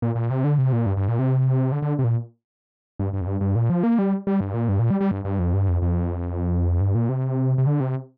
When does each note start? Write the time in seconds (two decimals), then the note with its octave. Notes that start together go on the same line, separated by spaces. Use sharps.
0.02 A#2
0.15 A#2
0.30 C3
0.44 D3
0.58 C3
0.73 A#2
0.86 G2
0.97 G2
1.08 A#2
1.19 C3
1.72 D3
1.82 D3
1.99 C3
2.04 A#2
3.00 G2
3.13 G2
3.21 F2
3.27 G2
3.41 G2
3.55 A#2
3.70 F3
3.83 A#3
3.99 G3
4.27 G3
4.41 G2
4.54 A#2
4.69 G2
4.79 A#2
4.90 G3
5.01 G3
5.11 G2
5.25 G2
5.39 F2
5.54 G2
5.68 F2
5.82 F2
6.80 G2
6.95 A#2
7.09 C3
7.58 C3
7.67 D3
7.80 C3